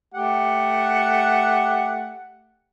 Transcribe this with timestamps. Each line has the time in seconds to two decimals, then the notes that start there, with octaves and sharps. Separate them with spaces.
0.14 A3 G4 F#5